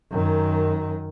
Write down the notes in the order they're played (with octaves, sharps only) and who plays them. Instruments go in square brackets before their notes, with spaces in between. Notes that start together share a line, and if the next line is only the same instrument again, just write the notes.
[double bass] F#2 D#3